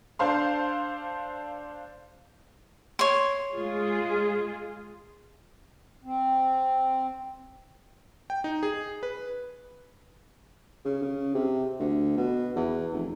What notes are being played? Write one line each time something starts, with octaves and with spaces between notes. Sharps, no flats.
D4 A4 C5 F5 C6
C#5 C6
G#3 F4 G#4
C4
G5
D#4
G#4
B4
C#3
C#3
C3
D2
B2
E2
F1